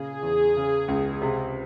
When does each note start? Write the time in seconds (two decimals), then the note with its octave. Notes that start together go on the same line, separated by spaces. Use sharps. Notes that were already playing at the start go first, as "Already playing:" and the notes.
Already playing: A#2 C#3 G#4
0.23 E2
0.56 C#3
0.88 C#2
1.22 C3